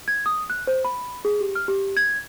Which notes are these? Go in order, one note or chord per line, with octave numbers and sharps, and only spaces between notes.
G#6
D#6
F#6
C5
B5
G#4
G4
F6
G4
G#6